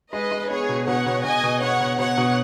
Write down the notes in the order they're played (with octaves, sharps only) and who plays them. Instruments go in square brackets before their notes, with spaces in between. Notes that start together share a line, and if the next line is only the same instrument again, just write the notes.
[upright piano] G#3 [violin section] B4 D#5
[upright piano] G#3
[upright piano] B3 [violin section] G#4 C#5
[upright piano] B2
[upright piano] B2 [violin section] C#5 F#5
[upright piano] B2
[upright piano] B2 [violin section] D#5 G#5
[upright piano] B2
[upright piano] B3 [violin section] C#5 F#5
[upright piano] B2
[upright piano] B2 [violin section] C#5 F#5
[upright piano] B2